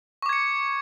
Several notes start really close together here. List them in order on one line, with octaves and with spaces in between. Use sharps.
C#6 D6 G#6 C#7